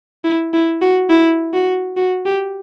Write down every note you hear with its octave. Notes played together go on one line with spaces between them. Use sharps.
E4
E4
F#4
E4
F#4
F#4
G4